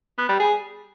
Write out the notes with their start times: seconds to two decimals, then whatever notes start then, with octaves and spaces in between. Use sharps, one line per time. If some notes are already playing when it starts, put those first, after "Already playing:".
0.18 B3
0.29 G3
0.40 G#4